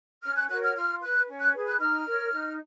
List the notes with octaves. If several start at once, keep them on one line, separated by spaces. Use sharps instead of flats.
C#4 F6
F#6
F#4 A#4 C#5 F#6
F6
F4 F6
B4 F#6
C#4
F#6
G#4 B4
F#6
D#4 F6
A#4 C#5
D#4